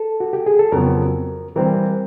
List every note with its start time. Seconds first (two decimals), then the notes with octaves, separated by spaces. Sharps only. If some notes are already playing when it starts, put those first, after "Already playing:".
Already playing: A4
0.20 F#4
0.33 G4
0.46 G#4
0.59 A4
0.72 F2 C#3 F#3 B3 A#4
1.56 E3 G3 C4 A#4